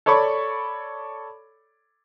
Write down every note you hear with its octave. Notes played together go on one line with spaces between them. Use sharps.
A4 C#5 D5 B5 C#6